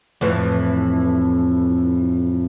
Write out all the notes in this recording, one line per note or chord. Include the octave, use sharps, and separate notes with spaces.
F2 A2 E3